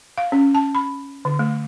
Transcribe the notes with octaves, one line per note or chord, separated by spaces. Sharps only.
F5
C#4
A5
B5
D3
A3